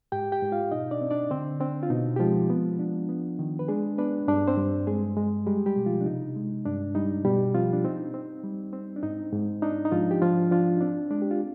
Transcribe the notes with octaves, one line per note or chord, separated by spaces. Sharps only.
G#2 G4 G5
G4 G5
G#2
F4 F5
B2 D#4 D#5
D4 D5
C4
D4 D5
D3 C4 C5
C4 D4
F4
B2 D#4
G4
F3 G#3 F4
B3
D4
B3
D#3
B4
G#3 D4 G#4
B3 D4 B4
G2 D4 D5
C4 C5
G2
G#3 G#4
G#3
G3 G#3 G4
G3 G4
B2
F3 F4
D4
C3 D#4
G#3
G2 D4
G3 D#4
B2 G3 G4
F3 C4 F4
D4
C4 D#4
C4
G3
C4
D4
G#2 D#4
G#2
D4 D#4
D#4
G#2 F3 F4
G4
F3 D4 F4
F3 D4 F4
D#4
C4 D4
G#3 D4
G4
F4